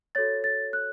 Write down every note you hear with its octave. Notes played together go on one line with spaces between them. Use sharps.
F#4 A4 C#5 A6
A6
F#6